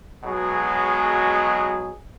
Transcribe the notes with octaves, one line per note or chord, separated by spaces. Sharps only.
B1 B2 F#3 G#3 G#4